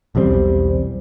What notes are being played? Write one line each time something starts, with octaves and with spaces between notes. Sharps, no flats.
B1 E2 G3 C4